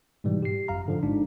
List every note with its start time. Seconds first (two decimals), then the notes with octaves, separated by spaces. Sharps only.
0.24 G#2 B2 E3 G3
0.43 G4 C7
0.68 G1 F#2 F5 A#5
0.86 G#2 D3 F3
1.03 G#1 G#2 D4